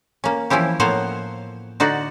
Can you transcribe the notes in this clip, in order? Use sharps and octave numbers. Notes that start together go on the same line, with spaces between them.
A#3 C#4
E3 F3 C#4 E4 G4
A2 F3 A#3 B3 C5 C#5
D3 D#4 F#4 D5